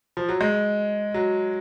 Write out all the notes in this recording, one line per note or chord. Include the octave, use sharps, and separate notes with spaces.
F3
F#3
G#3
F#3